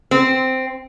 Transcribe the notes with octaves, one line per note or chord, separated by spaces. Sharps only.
C4